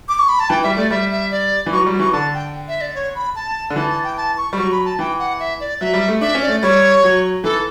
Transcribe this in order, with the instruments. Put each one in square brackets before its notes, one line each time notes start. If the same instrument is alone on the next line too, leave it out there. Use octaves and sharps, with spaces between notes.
[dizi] D6
C#6
B5
A5
[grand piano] E3 [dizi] G5
[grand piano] G3 [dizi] E5
[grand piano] A3 [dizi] D5
[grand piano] G3 [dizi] E5
[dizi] E5
D5
[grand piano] E3
[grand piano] F#3 [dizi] C#6
[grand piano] G3
F#3
[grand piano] E3 [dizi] C#6
[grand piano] D3 [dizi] A5
[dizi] G5
E5
D5
C#5
B5
A5
[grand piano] D3
[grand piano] E3 [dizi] A5
[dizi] A5
G5
A5
C#6
[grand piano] G3
[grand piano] F#3 [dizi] C#6
[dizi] B5
A5
[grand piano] E3 [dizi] G5
[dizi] F#5
E5
D5
[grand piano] F#3 [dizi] E5
[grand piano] G3
A3
[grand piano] D4 [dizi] E5
[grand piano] C#4
[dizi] D5
[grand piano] A3
[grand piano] G3 [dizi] C#5
[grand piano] F#3
[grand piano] E3 [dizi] A4